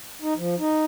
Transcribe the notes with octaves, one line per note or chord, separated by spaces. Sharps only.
D#4
F3
D#4